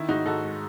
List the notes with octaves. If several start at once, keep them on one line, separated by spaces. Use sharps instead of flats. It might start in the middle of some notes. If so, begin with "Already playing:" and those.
Already playing: D#3 E4
G#2 D#4 F#4
G#2 F#4 A4
G#3